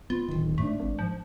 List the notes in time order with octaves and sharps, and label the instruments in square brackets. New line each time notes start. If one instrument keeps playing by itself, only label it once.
[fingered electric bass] B3 [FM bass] F4
[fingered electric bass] D1 D#3
[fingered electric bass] G#2 D4 [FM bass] A3
[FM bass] G#1
F3